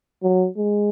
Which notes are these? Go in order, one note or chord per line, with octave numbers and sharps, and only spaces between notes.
F#3
G#3